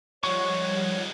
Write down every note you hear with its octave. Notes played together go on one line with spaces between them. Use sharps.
D#3 F3 G3 G#3 C#5 F#5 C#6